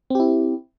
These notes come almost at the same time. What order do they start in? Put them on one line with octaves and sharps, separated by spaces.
C4 G4 E4